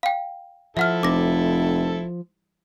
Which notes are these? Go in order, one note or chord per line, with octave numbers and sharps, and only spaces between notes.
F5 G5
F3 E4 A4 E5 F#5 F6
F1 D6 A#6